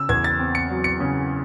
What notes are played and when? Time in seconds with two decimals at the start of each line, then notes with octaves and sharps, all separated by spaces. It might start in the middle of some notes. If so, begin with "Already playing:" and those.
Already playing: C#3 E6
0.09 E2 G#6
0.24 A6
0.39 C4
0.55 C#7
0.70 F#3
0.84 C#7
1.00 C#3